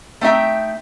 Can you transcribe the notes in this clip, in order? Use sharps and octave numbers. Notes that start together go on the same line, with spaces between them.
A3 C4 D#4 E5 G5